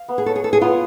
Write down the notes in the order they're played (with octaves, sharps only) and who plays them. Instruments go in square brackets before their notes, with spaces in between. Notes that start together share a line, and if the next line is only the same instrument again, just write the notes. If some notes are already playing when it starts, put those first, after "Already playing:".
Already playing: [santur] F5
B3
[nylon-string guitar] G#4
[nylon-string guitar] A4 [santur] C#5
[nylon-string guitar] G#4
[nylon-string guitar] A4 [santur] C#5
[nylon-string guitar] G#4
[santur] B3 [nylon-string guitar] F4